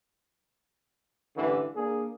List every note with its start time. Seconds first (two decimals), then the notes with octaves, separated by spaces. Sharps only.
1.36 A1 G2 D3 E3
1.74 A#3 D4 G#4